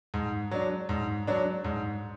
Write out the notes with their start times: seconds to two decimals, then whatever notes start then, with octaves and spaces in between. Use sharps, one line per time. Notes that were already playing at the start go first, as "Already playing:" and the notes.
0.14 G#2
0.51 F#3 D4
0.89 G#2
1.27 F#3 D4
1.64 G#2